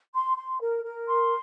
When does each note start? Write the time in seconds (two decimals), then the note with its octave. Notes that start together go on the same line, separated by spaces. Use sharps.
0.13 C6
0.37 C6
0.60 A#4
0.84 A#4
1.07 C6